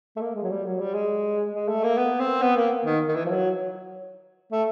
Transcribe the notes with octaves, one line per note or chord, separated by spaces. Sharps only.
A3
A#3
G#3
F#3
G3
F#3
G3
G#3
G#3
A3
A#3
B3
C4
B3
A#3
D#3
D#3
E3
F3
F#3
A3